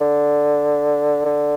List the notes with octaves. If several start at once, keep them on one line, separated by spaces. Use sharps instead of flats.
D3
D3